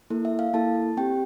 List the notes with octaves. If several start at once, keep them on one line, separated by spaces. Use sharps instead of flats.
A#3 E4 A4
E5
F5
A#3 E4 A4 A5
C4 G4 G5